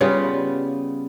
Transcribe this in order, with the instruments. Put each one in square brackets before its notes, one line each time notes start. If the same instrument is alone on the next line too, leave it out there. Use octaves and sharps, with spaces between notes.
[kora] C#3 G3 B3 F4